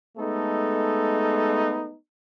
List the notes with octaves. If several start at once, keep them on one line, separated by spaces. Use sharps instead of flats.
G#3 A3 B3 D#4 A4